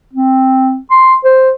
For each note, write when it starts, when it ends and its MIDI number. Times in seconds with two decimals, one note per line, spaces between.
0.13 0.78 60
0.91 1.16 84
1.24 1.53 72